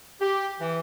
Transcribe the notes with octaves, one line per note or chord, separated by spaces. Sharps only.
G4
E3